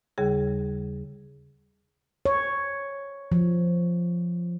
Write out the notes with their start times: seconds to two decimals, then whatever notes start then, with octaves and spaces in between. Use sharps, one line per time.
0.18 D#2 C#3 G3 G#4
2.26 C#5
3.32 F3